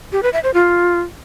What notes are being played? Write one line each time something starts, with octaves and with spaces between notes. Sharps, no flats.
G4
B4
E5
C5
F4